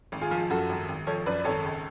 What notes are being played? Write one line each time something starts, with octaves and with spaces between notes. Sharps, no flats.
G#1
F4 G#4
F3
F#2 F#4 A4
G#1
G#1
F3 A4 C#5
F#2 B4 D5
G#1 A4 C#5
C#2